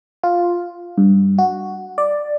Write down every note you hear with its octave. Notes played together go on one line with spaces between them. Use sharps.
F4
G2
F#4
D5